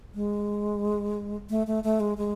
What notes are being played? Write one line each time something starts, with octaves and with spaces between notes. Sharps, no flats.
G#3
A3
A3
A3
G#3
G#3